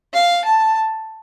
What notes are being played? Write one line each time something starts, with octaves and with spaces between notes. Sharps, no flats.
F5
A5